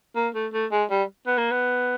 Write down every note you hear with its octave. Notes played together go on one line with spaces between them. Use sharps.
A#3
A3
A3
G#3
G3
B3
A#3
B3